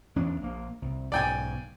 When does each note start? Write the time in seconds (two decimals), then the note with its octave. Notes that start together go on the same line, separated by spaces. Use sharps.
0.16 E2 C#4 D4
0.41 A#1 A#3
0.82 C2
1.12 B1 G#2 C#3 D5 G5 G#5